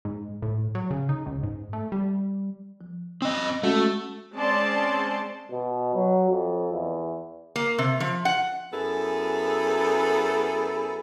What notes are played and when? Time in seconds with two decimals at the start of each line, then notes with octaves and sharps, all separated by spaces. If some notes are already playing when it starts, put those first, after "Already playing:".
0.05 G#2
0.42 A2
0.75 F#3
0.91 C#3
1.09 D#4
1.26 C#2
1.43 G#2
1.73 A3
1.92 G3
2.81 F3
3.22 C4 D#5
3.63 G#3 A3 C#4 F#4
4.34 G#3 C4 C#4 D5 A5 C6
5.51 B2
5.95 F#3
6.31 F2
6.72 E2
7.56 A#3
7.78 C3
8.00 F3
8.25 F#5
8.72 F#2 B3 E4 G#4 A4